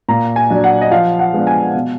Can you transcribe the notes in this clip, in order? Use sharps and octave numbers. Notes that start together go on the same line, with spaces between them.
A#2 A#5
G#5
F#3 D4
F#5
D#5
F3 F5
F#5
G#3 B3 D4
G#5
B2